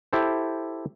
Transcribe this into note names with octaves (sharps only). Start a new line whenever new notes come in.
E4 G4 A4 C5